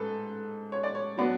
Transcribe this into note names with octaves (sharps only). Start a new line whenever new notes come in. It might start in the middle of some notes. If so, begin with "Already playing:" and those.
Already playing: G#2 A4 B4
C#5
D5
C#5
F#3 B3 D4